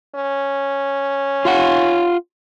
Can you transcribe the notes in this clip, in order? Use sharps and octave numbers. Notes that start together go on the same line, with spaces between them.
C#4
F4 F5 F#5